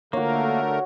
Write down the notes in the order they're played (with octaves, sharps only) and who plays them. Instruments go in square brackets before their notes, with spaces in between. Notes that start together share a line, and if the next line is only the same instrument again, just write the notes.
[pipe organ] D3 A3 A#4 [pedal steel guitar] A#3 [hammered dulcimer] F#4 C#5